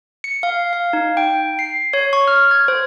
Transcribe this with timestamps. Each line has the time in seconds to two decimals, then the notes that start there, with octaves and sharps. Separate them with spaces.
0.24 C#7
0.43 F5
0.73 F5
0.93 D#4
1.17 G5
1.59 C7
1.93 C#5
2.13 C#6
2.28 F6
2.51 G#6
2.68 C5